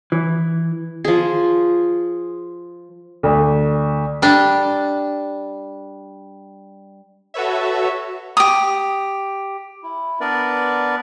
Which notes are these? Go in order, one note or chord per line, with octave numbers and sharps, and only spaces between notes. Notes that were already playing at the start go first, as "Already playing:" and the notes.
E3
F3 G#4
D2
G3 D4
F#4 A4 B4 C#5 E5
G4 D#6
E4
B3 D4 A#4 B4 D5